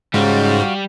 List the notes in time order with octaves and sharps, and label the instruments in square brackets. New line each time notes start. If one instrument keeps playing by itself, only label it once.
[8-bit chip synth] G#2 [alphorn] C#3 [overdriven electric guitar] G3 [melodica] F#4 F5